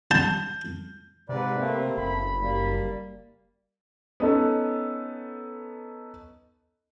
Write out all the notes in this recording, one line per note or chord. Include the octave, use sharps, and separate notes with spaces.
A5 G6
G#2 C3 B4 D5
A3 A#3 C4
F#1 B5
G3 A#3
B3 C#4 D#4 A4